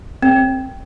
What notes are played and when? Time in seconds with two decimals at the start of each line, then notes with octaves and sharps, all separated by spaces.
0.22 C4